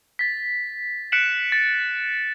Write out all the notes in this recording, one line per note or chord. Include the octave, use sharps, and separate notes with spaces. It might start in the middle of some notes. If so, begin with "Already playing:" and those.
A6 B6
F#6 B6 C#7 D7 E7 F#7
A6